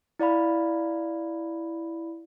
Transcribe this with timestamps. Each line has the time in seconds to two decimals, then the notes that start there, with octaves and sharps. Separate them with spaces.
0.19 E4 D5 F5 B5